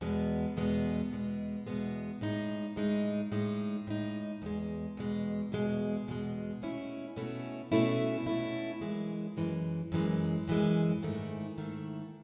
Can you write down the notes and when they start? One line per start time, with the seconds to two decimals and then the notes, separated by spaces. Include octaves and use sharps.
0.01 E2 B2 G#3 B3
0.57 E2 B2 G#3 B3
1.12 E2 B2 G#3 B3
1.67 E2 B2 G#3 B3
2.21 A2 G#3 D#4
2.76 A2 G#3 D#4
3.32 A2 G#3 D#4
3.87 A2 G#3 D#4
4.42 E2 B2 G#3
4.97 E2 B2 G#3
5.52 E2 B2 G#3
6.07 E2 B2 G#3
6.62 B2 A3 C#4 E4
7.16 B2 A3 C#4 E4
7.72 B2 A3 C#4 E4
8.27 B2 A3 C#4 E4
8.81 F#2 E3 G#3
9.37 F#2 E3 G#3
9.92 F#2 E3 G#3
10.48 F#2 E3 G#3
11.02 G#2 D#3 A3 E4
11.57 G#2 D#3 A3 E4